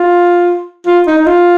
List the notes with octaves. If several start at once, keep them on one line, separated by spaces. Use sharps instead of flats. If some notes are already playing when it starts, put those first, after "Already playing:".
Already playing: F4
F4
D#4
D#4
F4